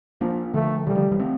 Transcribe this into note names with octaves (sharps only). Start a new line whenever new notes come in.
F3 A#3 D4
D3 F3 A3
C3 E3 G3
D3 F3
E3 G3
A3 C4